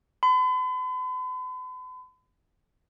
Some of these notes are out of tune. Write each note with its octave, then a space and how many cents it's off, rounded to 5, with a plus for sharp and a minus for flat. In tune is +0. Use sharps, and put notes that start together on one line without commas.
B5 +45